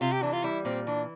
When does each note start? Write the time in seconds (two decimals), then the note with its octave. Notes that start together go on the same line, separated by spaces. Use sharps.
0.01 C3 F4
0.12 G4
0.22 E3 D4
0.33 F4
0.44 G3 E4
0.65 A#2 C4
0.87 E3 D4